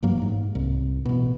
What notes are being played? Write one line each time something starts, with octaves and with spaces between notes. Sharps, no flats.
A1 G2 F#3 A#3
G#2
C2
A1 B2